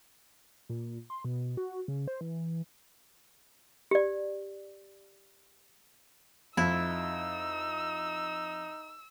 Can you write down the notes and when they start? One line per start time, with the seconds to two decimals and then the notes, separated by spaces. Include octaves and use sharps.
0.69 A#2
1.10 C6
1.25 B2
1.57 F#4
1.88 C#3
2.07 C5
2.21 E3
3.91 G4 D5
6.57 F2 D#4 E4 E6